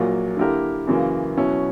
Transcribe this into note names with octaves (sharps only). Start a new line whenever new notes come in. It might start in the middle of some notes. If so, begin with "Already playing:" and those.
Already playing: A#1 A#2 F#3 A#3
D3 A#3 E4 G4 A#4
F#2 C#3 E3 A#3
B2 F#3 C#4 E4